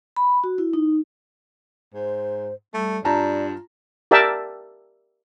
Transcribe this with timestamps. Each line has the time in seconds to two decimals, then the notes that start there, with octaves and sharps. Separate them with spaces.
0.17 B5
0.44 F#4
0.58 E4
0.73 D#4
1.94 G#2 C5
2.74 G3 A3
3.05 G2 F4 D5 A5 A#5
4.11 G4 A#4 D5 E5 G5 A5